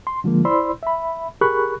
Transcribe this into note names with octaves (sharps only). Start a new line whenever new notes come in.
C6
D3 F3 G#3 A#3
E4 C5 D5 B5 C6 E6
E5 B5
G4 G#4 A#4 B5 C#6 F#6